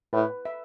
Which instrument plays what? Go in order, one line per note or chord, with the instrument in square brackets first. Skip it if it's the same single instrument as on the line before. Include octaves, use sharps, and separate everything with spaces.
[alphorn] A2 [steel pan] B4
[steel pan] E5